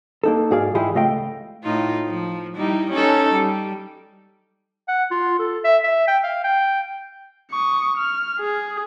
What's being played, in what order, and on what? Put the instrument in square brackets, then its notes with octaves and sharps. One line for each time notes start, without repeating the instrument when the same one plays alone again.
[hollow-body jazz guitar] A#3 D#4 A4
G#2 F#4 G#4 D5 F5
G#2 E3 E4 F4 G4 G#4
C#2 A3 D#5 F5 G5
[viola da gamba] A2 D#4 F4
F3
G3 D#4 E4
C#4 D#4 A4
G3
[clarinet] F#5
F4
A4
E5
E5
G5
F5
G5
[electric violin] C#6 D#6
F6
G#4